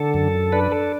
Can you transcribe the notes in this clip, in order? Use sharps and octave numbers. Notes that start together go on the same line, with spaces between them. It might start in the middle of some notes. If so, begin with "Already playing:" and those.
Already playing: D3 A4
F#2
D4 B4
A4